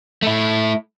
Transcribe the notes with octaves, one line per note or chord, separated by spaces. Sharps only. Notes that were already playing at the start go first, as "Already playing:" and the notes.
A3 E4